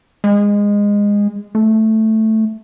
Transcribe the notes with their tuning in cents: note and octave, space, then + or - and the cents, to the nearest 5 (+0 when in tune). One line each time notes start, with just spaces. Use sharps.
G#3 -20
A3 +0